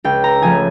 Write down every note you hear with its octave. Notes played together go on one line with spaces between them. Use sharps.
C#2 G5
A#5
C#3 F3 A3 G#5